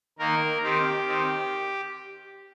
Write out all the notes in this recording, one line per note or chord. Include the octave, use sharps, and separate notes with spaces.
D#3 A#3 A#4
D#3 C4 G4
D#3 C4